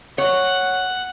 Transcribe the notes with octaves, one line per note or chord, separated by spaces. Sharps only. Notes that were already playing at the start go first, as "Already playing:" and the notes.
C#5 F#5